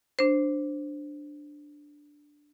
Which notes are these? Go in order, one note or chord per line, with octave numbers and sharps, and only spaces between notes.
D4 C5